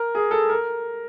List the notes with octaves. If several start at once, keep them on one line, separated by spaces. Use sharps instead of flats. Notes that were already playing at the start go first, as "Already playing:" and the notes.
Already playing: A#4
G#4
A4
A#4